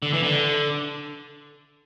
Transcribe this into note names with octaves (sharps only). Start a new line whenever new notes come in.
D3
E3
D3